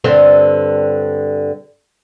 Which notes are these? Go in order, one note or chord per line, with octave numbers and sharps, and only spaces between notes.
G2 D3 C4